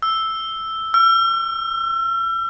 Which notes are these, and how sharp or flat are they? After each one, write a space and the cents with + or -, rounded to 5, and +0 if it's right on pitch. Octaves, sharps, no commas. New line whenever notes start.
E6 +0
E6 +40